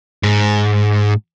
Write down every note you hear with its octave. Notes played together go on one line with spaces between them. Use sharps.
G#2